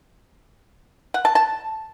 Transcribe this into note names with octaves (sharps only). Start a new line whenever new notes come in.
F#5
A5
A5